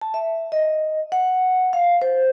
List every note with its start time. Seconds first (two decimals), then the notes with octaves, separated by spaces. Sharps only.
0.01 A5
0.14 E5
0.52 D#5
1.12 F#5
1.73 F5
2.02 C5